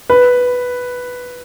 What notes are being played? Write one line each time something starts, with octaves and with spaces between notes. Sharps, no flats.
B4